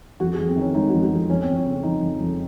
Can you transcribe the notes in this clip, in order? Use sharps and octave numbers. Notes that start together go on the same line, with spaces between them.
F2 F#4
G#4
F2
C4
D#3 C#4
G#3 D#4
F2 F#4
F#4
F2 F4
F2 C#4
C4
F2
C#4
C#3
C4
F3 D#4
F2
F2